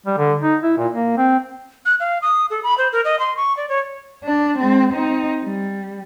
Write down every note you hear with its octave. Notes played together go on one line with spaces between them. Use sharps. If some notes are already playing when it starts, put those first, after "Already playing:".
G3
D3
D#4
E4
A#2
A#3
C4
F#6
F5
D#6
A4
B5
C5
A#4
D#5
C6
C#6
D5
C#5
D4
G#3 C4
C4 D#4
G3